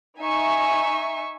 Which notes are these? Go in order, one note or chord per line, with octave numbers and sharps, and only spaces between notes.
D#4 E5 G#5 C#6